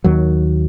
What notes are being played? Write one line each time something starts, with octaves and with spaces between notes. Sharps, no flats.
D#2 D#3 F#3